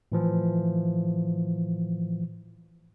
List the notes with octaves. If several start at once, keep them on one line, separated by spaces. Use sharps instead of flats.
A2 E3 F3